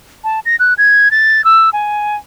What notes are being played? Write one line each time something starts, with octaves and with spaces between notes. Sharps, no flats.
A5
A#6
F#6
G#6
A6
E6
G#5